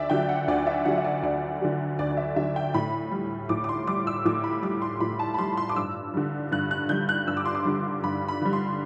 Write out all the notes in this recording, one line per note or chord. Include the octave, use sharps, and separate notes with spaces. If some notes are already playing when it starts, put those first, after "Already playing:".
Already playing: D2 D5 E5
D3 F#3 G5
F#5
D2 D5
E5
D3 F#3 F#5
E5
D5
D2 D5
D3 F#3
D2 D5
D5
E5
D3 F#3 E5
G5
A2 B5
G3
A2 D6
D6
C6
G3 D6
E6
A2 D6
B5
G3 D6
C6
A2 B5
A5
B5
G3 C6
C6
D6
G2 E6
D3 G3
G2 F#6
F#6
D3 G3 G6
F#6
G2 E6
D6
C6
D6
D3 G3
G2 B5
B5
D3 G3
C6